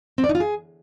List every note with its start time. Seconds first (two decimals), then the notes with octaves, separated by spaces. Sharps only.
0.18 C4
0.24 D5
0.29 D#4
0.35 F4
0.40 G#4